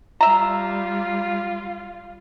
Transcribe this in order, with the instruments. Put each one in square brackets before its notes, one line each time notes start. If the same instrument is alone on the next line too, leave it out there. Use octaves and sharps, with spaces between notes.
[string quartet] G3 F4 [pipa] E5 A#5